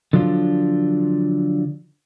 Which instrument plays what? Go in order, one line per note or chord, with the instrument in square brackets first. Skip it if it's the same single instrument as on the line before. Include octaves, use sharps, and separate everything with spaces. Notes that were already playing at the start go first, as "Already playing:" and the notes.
[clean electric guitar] D3 F3 F#3 D4 F4